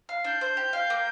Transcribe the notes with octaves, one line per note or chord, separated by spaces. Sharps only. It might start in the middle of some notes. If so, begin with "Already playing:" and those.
F5
D4 G6
C5
G4
F5
A#3